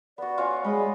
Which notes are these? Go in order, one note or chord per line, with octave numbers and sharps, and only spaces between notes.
B3 F#4 D5
F4 C#5 G#5
G#3 D#5 B5